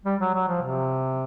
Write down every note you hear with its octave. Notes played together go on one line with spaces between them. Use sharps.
G3
F#3
F#3
F3
C3